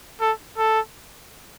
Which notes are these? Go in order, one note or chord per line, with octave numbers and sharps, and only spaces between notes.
A4
A4